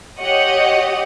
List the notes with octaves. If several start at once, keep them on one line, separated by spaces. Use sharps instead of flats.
G4 C#5 D#5 F#5